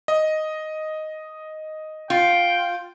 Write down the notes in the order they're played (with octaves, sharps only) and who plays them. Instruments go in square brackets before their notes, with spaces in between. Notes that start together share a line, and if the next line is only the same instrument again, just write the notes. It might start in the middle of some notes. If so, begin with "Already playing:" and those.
[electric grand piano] D#5
[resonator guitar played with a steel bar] F4 [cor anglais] G5